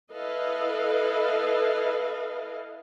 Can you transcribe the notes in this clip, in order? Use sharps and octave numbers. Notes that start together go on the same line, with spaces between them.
E4 A4 B4 D#5 F5